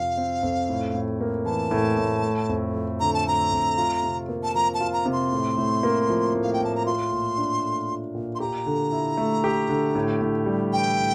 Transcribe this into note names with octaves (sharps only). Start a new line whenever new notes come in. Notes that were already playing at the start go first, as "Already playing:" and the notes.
Already playing: F2 C3 F3 C4 F5
C4
F2
A2
A2
A#3
E3 A5
A2
A2
A3
F2
F3
D3 A#5
A5
A3 A#5
F2
F4
C3
A#3
A5
F3 A#5
A5
F4
A#5
C3
C6
A2
A2
A#3
F3
A2
F5
G5
A2 A5
A#5
F4 C6
A#2
D4
A3
F4
A#2
C6
G4 A#5
D3
E4
A3
G4
D3
A2
A2
G3
E3 G5
A2